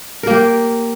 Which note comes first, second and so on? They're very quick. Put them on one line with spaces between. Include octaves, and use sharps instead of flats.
A#4 A#3 G4